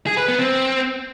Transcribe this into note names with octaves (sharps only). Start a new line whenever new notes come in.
G#4
B4
B3
C4